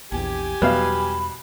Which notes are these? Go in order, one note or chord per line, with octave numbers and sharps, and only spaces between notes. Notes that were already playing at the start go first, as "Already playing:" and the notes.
A#1 E2 G4 G#5
E2 B2 F#3 G3 F5 B5